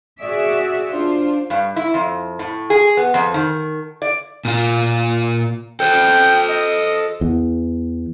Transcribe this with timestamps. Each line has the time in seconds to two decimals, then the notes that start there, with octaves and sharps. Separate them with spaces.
0.21 F#4 G#4 D5 E5
0.90 D4 F4 C5
1.50 G2
1.76 E4
1.94 F2
2.39 A2
2.70 G#4
2.97 B3
3.14 F2
3.34 D#3
4.02 D5
4.45 A#2 F4
5.80 A4 C5 G5
6.49 D#5
7.21 E2